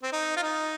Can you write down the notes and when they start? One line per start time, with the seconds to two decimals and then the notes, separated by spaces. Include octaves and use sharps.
0.03 C4
0.12 D#4
0.36 F4
0.43 D#4